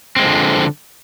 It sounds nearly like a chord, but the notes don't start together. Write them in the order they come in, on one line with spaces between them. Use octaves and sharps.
C4 G#3 F3 D3